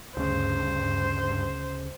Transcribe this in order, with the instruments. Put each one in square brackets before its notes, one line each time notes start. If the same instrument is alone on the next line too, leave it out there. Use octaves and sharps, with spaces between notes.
[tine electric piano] D2 C#3 [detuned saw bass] G2 [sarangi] C5